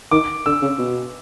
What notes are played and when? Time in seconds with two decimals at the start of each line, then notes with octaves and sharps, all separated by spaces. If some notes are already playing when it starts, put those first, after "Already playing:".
0.11 D#3 D6
0.46 D3 E6
0.62 C#3
0.79 B2